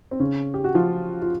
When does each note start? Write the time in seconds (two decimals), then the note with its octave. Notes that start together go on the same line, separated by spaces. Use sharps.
0.11 C4
0.20 C#3 C#4
0.54 G4
0.64 F#4
0.75 F3 F4
1.22 F4